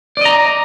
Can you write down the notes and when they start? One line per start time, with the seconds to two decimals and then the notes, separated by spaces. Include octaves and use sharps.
0.17 D5
0.21 D#5
0.25 A#5